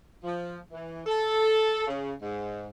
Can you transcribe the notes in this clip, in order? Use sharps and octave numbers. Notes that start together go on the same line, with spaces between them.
F3
E3
A4
C#3
G#2